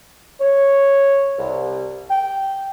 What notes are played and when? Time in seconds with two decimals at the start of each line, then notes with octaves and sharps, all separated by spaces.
0.40 C#5
1.38 C2
2.10 G5